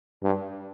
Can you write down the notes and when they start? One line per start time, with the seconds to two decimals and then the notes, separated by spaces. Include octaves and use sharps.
0.23 G2